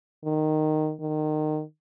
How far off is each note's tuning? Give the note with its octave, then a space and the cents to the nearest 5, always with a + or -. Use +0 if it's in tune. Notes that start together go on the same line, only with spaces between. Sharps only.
D#3 -10
D#3 -25